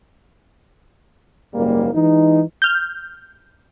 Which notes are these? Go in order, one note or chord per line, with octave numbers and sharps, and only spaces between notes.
F#1 G#2 G3 A#3
E3 G#3 D#4
F6 G6